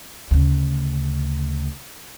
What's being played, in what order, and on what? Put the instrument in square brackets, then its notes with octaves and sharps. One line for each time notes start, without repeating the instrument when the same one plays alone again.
[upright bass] D2 C#3